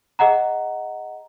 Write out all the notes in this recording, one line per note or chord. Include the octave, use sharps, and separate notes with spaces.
G#4 D#5 F#5 A#5